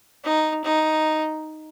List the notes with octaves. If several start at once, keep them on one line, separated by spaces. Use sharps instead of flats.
D#4
D#4